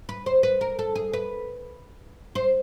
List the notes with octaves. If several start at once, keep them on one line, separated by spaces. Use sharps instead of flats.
B4
C5
B4
A#4
A4
G#4
B4
C5